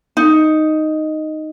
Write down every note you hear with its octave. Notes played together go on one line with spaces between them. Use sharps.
D#4